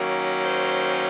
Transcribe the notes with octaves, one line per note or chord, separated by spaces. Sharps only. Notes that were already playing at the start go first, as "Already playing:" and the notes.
Already playing: D#3 F#3 A#3 C#4
C5